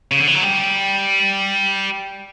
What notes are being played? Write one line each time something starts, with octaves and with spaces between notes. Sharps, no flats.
C#3
D3
E3
F#3
G3